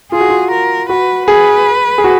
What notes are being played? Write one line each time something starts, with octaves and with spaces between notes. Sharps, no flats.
F4 G#4
F#4
F4
A#4
F#4 B4
G#4 B4
G#4
F#4